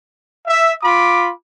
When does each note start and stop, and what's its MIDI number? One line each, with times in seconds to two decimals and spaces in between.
0.47 0.71 76
0.82 1.30 65
0.82 1.30 83
0.82 1.30 86